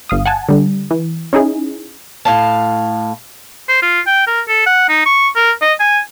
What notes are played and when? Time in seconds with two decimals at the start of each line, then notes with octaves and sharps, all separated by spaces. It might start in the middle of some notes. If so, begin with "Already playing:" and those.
0.09 G1 F5 D#6
0.26 F#5 G#5 A5
0.49 D3 G3
0.91 E3
1.33 C#4 D#4 E4 G#4
2.25 A2 F5 A5
3.69 C5
3.83 F4
4.07 G5
4.27 A#4
4.49 A4
4.66 F#5
4.89 D#4
5.06 C#6
5.36 A#4
5.62 D#5
5.80 G#5